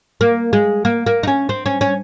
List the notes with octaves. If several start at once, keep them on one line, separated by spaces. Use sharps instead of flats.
A#3
G#3
A#3
A#3
D#4
C#4
C4
C#4
C#4